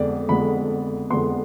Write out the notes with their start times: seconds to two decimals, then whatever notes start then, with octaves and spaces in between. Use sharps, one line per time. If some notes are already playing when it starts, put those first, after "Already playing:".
Already playing: F2 D3 G#3 B3 D5
0.29 F2 D3 G#3 B3 B5
1.10 F2 D3 G#3 B3 C6